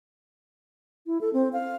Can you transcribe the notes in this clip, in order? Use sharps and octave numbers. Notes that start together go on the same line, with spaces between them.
E4
A4
C4
F5